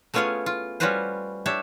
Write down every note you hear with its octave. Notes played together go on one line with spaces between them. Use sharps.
A3 B3 C#4 F4 G#4 C#5
F4
G3 C#4 F4 F#4 B4 C5
D4 G4 C#5 E5